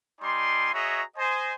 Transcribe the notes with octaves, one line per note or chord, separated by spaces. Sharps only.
G3 D#4 D5 G#5 C6
F#4 G#4 C#5 D#5 E5 A#5
C5 D#5 G#5